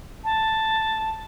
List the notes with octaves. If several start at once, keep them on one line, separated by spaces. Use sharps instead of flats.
A5